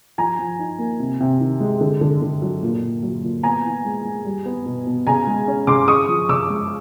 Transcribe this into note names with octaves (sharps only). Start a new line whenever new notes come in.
F3 G#5 A#5
F3
D#4
A#3
C3
C3
D#3
G#3
D3
D3
D3
F#3
A#2
A#2
F#3
A#2
B3 G#5 A#5
E3
G#3
G#3
G3
B3
B2
B2
C#3 G#5 A#5
G#3
C#4
C#3 C6 D6
C#3 C#6 D#6
F3
C#3 D6 E6
G#3